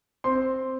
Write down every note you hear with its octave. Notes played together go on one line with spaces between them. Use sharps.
C4 C6